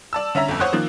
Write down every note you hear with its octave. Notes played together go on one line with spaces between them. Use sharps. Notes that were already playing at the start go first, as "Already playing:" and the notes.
D5 A5 E6
D3 C#4 E5 A#5
G1 F2
C5 C#5 F#5 C6 D#6 F#6
D#3 F3 A#3